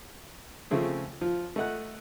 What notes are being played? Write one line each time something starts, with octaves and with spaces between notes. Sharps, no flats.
C#3 F3 A3 C4 G#4
F3 F4
A3 D#5 F#5 F#6